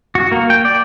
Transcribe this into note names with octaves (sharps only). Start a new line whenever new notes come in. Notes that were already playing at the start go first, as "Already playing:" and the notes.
F#4
A#3
G5
D5